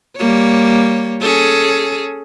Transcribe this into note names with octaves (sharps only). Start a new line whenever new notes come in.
G3 A#3 C#5
C#4 G#4 A4